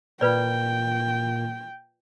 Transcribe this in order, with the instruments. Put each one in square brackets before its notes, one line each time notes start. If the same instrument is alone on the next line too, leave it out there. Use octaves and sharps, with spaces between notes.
[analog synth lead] A#2 [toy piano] F4 B4 D5 [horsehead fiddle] G5